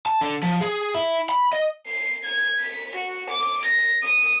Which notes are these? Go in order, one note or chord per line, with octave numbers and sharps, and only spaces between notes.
A5
D3
F3
G#4
E4
B5
D#5
C7
G#6
B6
F#4
D6
A#6
D#6